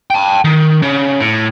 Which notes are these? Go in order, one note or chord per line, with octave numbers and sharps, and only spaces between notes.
G5 A5
D#3
C#3
A2